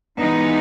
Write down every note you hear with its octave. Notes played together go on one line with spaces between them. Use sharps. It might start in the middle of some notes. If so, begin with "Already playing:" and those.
E3 G#3 B3 D#4